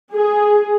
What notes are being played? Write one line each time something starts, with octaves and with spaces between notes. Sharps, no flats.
G#4